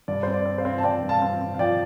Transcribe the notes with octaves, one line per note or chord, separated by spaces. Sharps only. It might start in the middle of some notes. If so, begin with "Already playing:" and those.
G2 D5
C4 C5
D5
C4
C5 F5
C4
A5
C4 D5 G5
G2
F5 A5
C4
C4
F5
F3 D5 G5